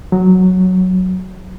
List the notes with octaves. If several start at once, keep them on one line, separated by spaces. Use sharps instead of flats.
F#3